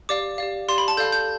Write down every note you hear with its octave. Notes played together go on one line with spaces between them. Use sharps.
G4 D5 F5 D6
G4 D5 F5
G4 D5 F5 C6
B5
A5
A4 D5 F5 G6
G6